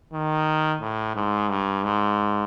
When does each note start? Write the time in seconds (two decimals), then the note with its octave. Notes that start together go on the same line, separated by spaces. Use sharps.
0.13 D#3
0.81 A2
1.15 G#2
1.49 G2
1.83 G#2